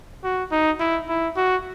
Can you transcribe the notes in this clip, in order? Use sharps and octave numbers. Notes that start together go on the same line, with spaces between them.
F#4
D#4
E4
E4
F#4